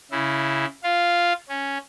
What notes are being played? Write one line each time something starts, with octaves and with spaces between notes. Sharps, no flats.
C#3 E4
F4 F5
C#4